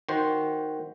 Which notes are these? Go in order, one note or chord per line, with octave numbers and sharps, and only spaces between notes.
D#3 F#4 C5